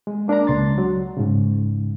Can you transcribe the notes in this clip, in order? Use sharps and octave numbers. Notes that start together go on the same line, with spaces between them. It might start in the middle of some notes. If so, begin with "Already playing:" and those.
G#3
A#3 D4 A#4 D5 A#5
C#2 C6 A6
F#3
G#2 C#3